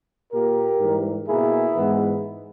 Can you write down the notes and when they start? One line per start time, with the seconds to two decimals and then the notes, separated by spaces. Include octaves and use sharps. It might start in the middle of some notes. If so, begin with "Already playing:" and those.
0.32 A#2 A#3 G4 A#4
0.80 G#2 E3 G3
1.28 B2 A#3 E4 G#4
1.76 G#2 E3 G#3 B3